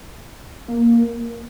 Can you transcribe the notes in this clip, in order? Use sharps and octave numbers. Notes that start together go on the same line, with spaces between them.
A#3